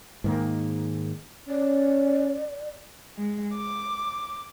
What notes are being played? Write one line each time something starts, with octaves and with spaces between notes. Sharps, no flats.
G#2 D#3 A#3
C#4 D5
G#3
D6